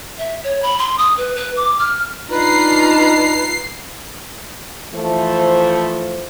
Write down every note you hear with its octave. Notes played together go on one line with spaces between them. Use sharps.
E5
C#5
B5
C6
D#6
B4
B4
D6
F6
D4 D#4 F4 B4 A#5 C7
E3 F3 A3 C5